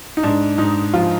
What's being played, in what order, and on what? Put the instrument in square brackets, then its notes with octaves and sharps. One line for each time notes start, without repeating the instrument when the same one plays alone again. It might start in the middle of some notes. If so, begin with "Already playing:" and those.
[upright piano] D#4
G#2 D4
G#2 D#4
F3 F4